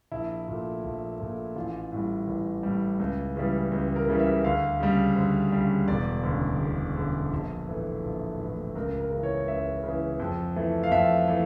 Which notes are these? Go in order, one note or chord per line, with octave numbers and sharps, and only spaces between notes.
A#1 E4
A#2 A3
A#1
A#2 A3
A1 F4
A2 G3
A1
A2 G3
C#2
C#3 E3 G3
C#2
A#4
C#3 E3 G3
E5
D2 F5
C#3 G3
D2
C#3 G3
E1 D5
D2 C#3
E1
D2 C#3
A#1
A2 E3 A3
A#1
A2 E3 A3
C#2 A#4
A#4
C#3 E3
C#5
C#2 E5
C#3 E3
F2
E3 A3
F5
F2 E5
E3 A3